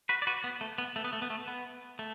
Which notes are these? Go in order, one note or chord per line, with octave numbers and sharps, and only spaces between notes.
F#4 B4
D5
F#4 B4
B3
A3
B3
A3
B3
A3
B3
A3
B3
A3